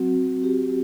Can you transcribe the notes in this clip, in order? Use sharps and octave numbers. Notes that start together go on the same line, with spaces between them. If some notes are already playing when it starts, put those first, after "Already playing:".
Already playing: F#3 C4 F#4
F#3
F#4 G4